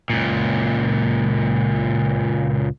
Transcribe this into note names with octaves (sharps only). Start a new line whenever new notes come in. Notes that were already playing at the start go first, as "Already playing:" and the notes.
C#2 A#2